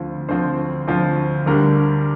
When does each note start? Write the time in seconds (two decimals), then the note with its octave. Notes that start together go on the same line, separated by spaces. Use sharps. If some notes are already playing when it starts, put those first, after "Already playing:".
Already playing: D2 D3 F3 C4
0.29 D2 D3 F3 C4 C5
0.88 D2 D3 F3 C4
1.46 D2 D3 G3 A#4